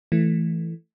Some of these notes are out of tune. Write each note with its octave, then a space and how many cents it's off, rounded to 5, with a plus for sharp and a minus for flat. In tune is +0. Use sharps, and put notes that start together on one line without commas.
E3 +5 A3 +0